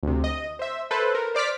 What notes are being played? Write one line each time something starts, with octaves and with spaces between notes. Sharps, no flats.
D2 C3
D#5
C5 E5
A4 B4 C5
A#4
C5 D5 D6 F6 B6